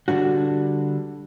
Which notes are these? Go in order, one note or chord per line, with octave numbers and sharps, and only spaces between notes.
D3 G3 D4 F#4